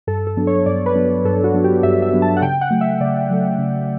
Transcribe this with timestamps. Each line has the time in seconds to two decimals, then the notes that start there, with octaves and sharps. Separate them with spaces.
0.07 G2 A4
0.27 A4
0.37 F#3 B3 D4
0.47 C#5
0.66 G2 D5
0.86 B4
0.95 F#3 B3 D4
1.05 B4
1.25 G2 A4
1.44 F#4
1.54 F#3 B3 D4
1.64 G4
1.83 G2 E5
2.02 E5
2.13 F#3 B3 D4
2.22 A5
2.37 F#5
2.42 C#3 G5
2.61 F#5
2.71 F#3 A3
2.81 E5
3.00 C#3 D5
3.30 F#3 A3
3.58 C#3